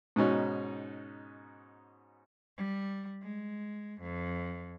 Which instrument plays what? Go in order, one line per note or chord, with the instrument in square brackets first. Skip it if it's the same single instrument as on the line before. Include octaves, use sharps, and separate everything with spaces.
[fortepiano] G#2 B2 C#4 D#4
[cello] G3
G#3
F2